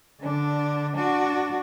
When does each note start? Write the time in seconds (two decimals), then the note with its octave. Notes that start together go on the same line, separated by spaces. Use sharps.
0.22 D3 D4
0.94 D4 F#4